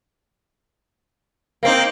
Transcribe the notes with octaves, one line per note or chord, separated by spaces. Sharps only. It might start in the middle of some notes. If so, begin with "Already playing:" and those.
A#3 C4 D#4 F5